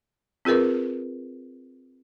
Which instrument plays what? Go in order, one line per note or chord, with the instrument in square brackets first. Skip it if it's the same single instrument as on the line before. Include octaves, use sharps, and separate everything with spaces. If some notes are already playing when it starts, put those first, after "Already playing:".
[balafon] C4 F4 G#4 A#4 B4